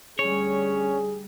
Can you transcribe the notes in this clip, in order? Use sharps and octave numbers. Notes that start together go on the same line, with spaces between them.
D2 G3 C#4 G#4 C#5